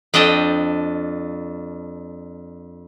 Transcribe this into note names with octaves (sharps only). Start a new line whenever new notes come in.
F2 D4 D#5 G5 A5